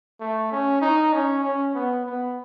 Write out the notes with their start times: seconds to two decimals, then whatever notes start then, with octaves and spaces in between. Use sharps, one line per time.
0.20 A3
0.52 C#4
0.82 D#4
1.13 C#4
1.44 C#4
1.75 B3
2.06 B3